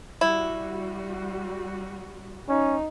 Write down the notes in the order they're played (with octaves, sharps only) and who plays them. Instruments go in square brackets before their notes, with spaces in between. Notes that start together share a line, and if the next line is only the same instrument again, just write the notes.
[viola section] G3 F#4 [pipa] E4
[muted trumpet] C#4 [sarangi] D#4